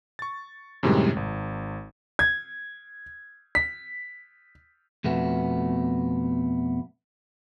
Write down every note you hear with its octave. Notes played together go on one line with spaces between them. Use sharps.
C#6 A6
F#2 A2 C3 D#3 G3 G#3
G#1
G#6
B6
F2 B2 A3 B3